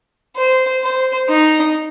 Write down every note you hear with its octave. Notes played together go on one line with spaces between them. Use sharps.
C5
C5
D#4